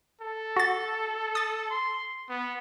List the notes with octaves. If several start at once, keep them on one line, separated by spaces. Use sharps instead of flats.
A4
F#4 A6
D#6 A6
C6
B3